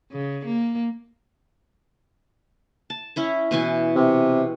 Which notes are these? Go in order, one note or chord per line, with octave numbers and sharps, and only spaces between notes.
C#3
A#3
A5
C#4 E4 C#5
B2 E3 G#5
C3